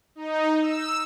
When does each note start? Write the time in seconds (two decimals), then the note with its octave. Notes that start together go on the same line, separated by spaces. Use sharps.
0.15 D#4
0.61 E6